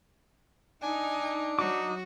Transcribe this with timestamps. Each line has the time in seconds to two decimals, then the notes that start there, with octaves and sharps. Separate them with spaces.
0.82 D4 D#4 G#5
1.59 F#3 D#4 F#4 D6